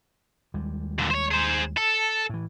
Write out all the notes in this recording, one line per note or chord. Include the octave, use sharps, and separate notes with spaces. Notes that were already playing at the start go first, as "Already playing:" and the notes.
D#2 G3 G#3
A#2 D3
C5 C#5
G#4 C5
A4
A2 E3